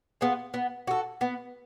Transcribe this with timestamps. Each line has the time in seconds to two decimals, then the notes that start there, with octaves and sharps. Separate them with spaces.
0.21 B3 F4 G#4
0.54 B3
0.87 F#4 A4
1.21 B3